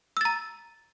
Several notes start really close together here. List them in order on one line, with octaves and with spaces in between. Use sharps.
E6 A6 A#5